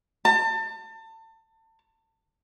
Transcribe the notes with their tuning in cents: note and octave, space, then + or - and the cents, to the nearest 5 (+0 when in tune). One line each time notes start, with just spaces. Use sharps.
A5 +30